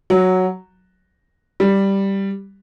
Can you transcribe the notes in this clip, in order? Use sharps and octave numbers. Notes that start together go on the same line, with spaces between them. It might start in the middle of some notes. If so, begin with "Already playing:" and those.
F#3
G3